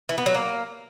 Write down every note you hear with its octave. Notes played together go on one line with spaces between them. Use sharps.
E3
B3
F#3
A#3